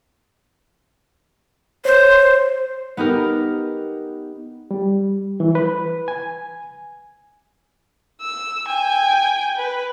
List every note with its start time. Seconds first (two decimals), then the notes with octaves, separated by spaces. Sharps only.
1.85 C5 C#5 G6
2.97 B3 D#4 G4 A#4
4.71 G3
5.40 E3
5.55 B4
6.08 G#5
8.21 E6
8.68 G5 G#5
9.57 B4